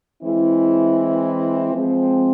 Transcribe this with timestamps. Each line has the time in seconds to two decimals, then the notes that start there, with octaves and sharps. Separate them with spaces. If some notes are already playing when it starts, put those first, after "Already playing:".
0.23 E3 G#3 C4 E4
1.72 F3 G#3 C4